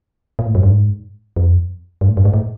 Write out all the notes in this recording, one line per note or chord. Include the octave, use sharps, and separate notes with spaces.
A#2
A2
F#2
G2
G#2
F2
G2
A2
G2
G#2
A2